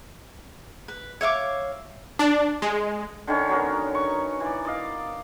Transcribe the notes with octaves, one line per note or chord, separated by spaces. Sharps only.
B4
C#5 E5 F5 D6
D4
G#3
D3 D#3 C#4
F#3 B3 A#4
C#6
E3 D5
D5 D#5 F5